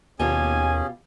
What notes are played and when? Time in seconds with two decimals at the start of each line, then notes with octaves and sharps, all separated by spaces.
0.19 D#2 B2 C#4 F4 G4 G#4 G#5